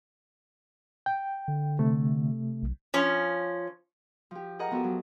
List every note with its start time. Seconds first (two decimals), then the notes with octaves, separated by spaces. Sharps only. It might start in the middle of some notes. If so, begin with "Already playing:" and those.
1.06 G5
1.48 D3
1.79 C3 A3
2.63 B1
2.94 F3 C#4
4.31 F3 G4
4.59 G#4 A#4 D#5 F#5 A#5
4.71 F3 B3 F#4 G4 A4
4.84 F#3